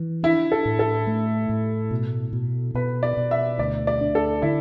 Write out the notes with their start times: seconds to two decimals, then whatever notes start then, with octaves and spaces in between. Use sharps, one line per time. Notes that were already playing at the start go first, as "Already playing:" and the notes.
Already playing: E3
0.23 D4 E4
0.52 A4
0.65 A2
0.79 A4
1.07 A3
1.49 A2
1.91 B2
2.33 B2
2.75 B2 B4
3.03 D5
3.17 B2
3.31 E5
3.59 D2 D5
3.87 D5
4.01 D4
4.15 A4
4.42 D3 E4